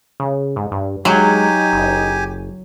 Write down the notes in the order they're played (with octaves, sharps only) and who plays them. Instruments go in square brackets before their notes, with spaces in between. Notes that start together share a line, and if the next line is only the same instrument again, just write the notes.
[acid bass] C#3
G#2
G2
[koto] F#3 [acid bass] G#3 [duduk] D#4 [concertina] G4 G#5
[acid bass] F#1